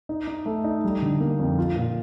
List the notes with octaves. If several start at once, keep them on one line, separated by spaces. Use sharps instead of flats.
D#4
D#4
A3
D#4
G3
D3
A#3
F2
F4
A#2